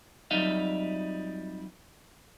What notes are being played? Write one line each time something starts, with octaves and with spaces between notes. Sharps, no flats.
F2 F#3 G3 D#4 E5 F5